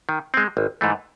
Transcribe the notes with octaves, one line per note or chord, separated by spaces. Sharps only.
D#3
G#3 C4
G#1
G#2 E3 A3